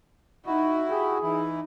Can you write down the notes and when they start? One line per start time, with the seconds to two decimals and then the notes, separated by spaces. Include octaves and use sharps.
0.46 D#4 E4 F#4
0.90 G4 G#4
1.22 E3 D#4 E4